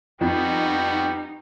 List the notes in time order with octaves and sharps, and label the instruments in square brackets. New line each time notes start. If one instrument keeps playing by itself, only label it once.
[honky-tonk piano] F2 [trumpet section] G3 B3 F#4 [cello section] D#4 [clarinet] G5